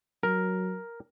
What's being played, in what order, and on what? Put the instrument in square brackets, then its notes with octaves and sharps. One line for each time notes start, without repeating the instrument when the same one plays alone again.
[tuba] F#3 [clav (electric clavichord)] A#4